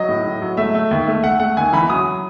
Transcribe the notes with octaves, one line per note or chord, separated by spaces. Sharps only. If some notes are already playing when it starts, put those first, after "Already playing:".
Already playing: F#3 D#5
A2
A2
F#3
A3 E5
A3
D#2
A3
A3 F#5
A3 F#5
D#2 G#5
E3 B5
F#3 D#6